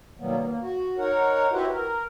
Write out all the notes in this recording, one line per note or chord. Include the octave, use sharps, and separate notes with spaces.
B2 D#3 F#3 G3 A#3 B3
A#3
F#4
D#4 A#4 C#5 F#5
E4 F#4 G4 B4 C5
A#4